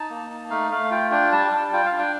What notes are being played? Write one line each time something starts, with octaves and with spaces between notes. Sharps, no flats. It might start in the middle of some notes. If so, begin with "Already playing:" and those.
Already playing: D#4 A5
A#3
D#4
A3 F5
A3 F5
F4 G5
D4 G5
G3 A5
G3
F4 G5
F5
D4
G5